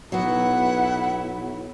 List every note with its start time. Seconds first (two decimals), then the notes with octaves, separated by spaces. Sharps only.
0.12 B1 F#3 B3 E4 F#5